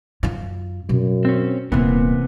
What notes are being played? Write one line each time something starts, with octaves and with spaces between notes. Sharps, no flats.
F#2 F4
F#2 B2
C4 C#4
D#1 C3 E3 A#3 B3 F4